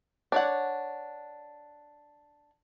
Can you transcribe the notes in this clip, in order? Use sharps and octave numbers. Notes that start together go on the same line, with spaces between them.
D4 C#5 F#5